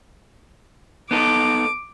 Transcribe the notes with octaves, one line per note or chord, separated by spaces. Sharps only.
B3 D#4 A4 D6